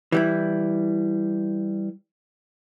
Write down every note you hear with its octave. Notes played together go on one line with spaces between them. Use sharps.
E3 G3 E4